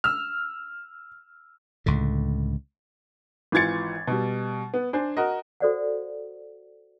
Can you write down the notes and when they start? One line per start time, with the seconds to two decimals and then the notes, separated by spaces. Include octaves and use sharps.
0.04 E6 F6
1.86 C#2 A2 D3
3.52 G#1 E3 F4 G#6 A6 C#7
4.07 B2 G3
4.74 B3
4.93 D4 C5 G#5
5.17 F#4 A#4 D#5
5.60 F#4 A4 C5 D5 F5 F#5